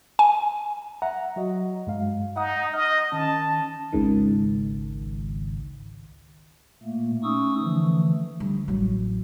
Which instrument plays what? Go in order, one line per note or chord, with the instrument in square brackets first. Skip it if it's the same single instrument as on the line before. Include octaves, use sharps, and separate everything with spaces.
[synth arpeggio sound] G#5
[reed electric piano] E5 F#5 A#5
F#3 F#4 D#5
G2 G#3 F5
[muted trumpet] D#4 [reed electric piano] F#5 D#6
[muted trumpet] D#5 [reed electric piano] F6
[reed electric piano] D#3 C#4 [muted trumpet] A5
[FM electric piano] G#1 C#2 G#2 D#3
[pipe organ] A#2 A3 A#3
A3 C#4 D#4 C#6 D#6 E6
D3 E3 F3 A3
[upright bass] D3 G3
A1 F#3